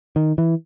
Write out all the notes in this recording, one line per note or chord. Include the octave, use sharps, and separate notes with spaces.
D#3
E3